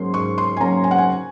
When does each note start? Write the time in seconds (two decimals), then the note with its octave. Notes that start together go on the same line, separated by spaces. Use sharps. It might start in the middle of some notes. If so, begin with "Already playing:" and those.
Already playing: G#2 F#3 A#3 C#4 C6
0.14 G#2 C#6
0.38 C6
0.57 G#5
0.60 F#3 A#3 C#4 A#5
0.84 G#5
0.91 F#5
0.98 G#5